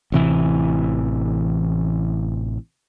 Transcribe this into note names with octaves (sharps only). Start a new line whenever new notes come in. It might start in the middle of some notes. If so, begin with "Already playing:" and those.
A1 C3 E3